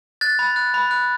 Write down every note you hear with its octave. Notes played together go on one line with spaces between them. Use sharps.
F#6 A6
B5
F#6
B5
F#6